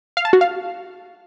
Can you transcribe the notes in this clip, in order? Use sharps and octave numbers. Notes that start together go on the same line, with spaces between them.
F5
A5
F#4
F5